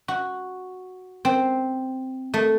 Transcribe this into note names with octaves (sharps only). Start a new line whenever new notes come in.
F#4
C4
A3